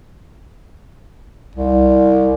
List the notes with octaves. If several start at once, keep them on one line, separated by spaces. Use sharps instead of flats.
C2